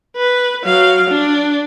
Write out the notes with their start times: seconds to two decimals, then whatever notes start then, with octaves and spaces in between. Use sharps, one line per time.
0.16 B4
0.64 F#3 F5
1.10 D4